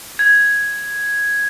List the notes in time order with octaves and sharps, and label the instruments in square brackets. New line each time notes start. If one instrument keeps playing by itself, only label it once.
[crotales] G#6